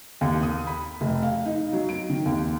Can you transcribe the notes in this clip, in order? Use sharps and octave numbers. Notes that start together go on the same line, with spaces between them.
D#2
D#6
B5
F1
F5
D#4
F#3
D7
D#3
D#2